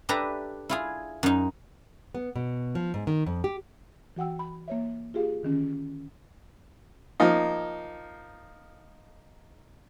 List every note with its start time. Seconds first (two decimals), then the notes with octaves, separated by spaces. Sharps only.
0.09 D4 G4 A4 B4 E5 A#5
0.69 E4 F4 G#4
1.23 F#2 D#4
2.15 B3
2.36 B2
2.75 F3
2.94 G#2
3.07 D#3
3.26 F2
3.44 G4
4.16 E3 F#4 F#5 G5 E6
4.39 B5
4.68 A#3 C#5 E5
5.14 F4 G4 G#4 F5
5.43 D3 D#3 C#4
7.20 F3 A#3 D#4